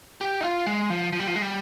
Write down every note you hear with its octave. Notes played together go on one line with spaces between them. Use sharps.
G4
D#4
F4
G#3
F3
F3
G3
F3
G#3
G3